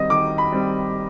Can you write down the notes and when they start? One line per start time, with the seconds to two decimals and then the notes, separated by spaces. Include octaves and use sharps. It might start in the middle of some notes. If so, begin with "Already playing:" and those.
Already playing: D#3 G3 C4 D#5
0.10 D#3 D6
0.38 B5
0.52 G3 C4